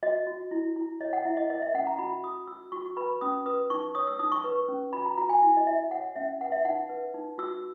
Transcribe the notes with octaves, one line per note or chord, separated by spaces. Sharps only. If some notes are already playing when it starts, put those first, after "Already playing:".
F#4 D#5
F#4
E4
E4
C#5 D#5
F#5
E4 E5
D#5
A#4 D#5
E5
C#4 F#5
A#5
F#4 B5
F#4 D#6
F#4 E6
F#4 C#6
C#6
B4 B5
C#4 D#6
B4 D#6
D#4 C#6
C#5 D#6
E6
D#4 D#6
C#6
B4
C#4
F#4 B5
A#5
F#4 A#5
G#5
E4 G#5
D#5
E4 E5
C#5 F#5
C#4 E5
B4 F#5
E5
D#4 F#5
B4
D#4
F#4 E6